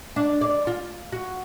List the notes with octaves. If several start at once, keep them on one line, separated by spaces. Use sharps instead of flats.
D4
D5
F4
F#4